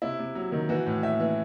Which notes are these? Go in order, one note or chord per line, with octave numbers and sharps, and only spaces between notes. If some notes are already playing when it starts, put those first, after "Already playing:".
C3 E4
C3
F#3
D#3
E3 F#4
A2
A2 E5
E3